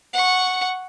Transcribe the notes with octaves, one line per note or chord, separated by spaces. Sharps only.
F#5 C#6